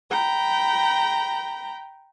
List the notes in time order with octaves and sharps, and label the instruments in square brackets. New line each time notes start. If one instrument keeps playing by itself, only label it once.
[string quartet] G5 A#5 B5